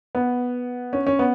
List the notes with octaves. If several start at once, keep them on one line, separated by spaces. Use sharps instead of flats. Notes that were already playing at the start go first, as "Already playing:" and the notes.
B3
C#4
C#4
B3